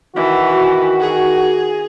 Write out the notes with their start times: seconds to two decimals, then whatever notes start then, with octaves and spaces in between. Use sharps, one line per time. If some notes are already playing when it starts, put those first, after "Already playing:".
0.16 D#3 E3 F#4
1.00 G#4